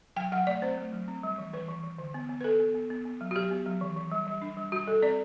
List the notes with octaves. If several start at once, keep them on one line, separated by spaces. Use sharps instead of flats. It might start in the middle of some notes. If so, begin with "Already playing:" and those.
F#3 G5
F#3 F#5
A3 D5
C4 C5
A3
F#3
C4
G3
E3
E3 B4
E3
E3
D3
B3
B3
B4
B3 A4
B3
B3
B3
B3
F#3
F#4
F#3 G4
B3
F#3
E3
E3
G3
G3
D4
G3
G3 F#4
G3 A4
C4 D5